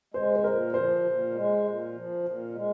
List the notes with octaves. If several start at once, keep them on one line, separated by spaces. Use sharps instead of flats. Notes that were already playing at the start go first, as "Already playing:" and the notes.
G#3 C5
C5
A#2 A#4
F3 C5
A#2
G#3
A#2
F3
A#2
G#3